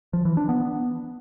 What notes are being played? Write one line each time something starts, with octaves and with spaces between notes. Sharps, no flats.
F3
E3
D4
B3